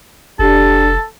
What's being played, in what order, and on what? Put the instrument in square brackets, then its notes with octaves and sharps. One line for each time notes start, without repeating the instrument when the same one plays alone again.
[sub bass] F1 [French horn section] D4 G4 [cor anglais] A4 [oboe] A5